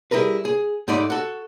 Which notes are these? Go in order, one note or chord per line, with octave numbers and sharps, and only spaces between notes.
G3 E4 G#4 A#4 B4
G#4
G#2 A3 D#4 D5 B5
F#4 A4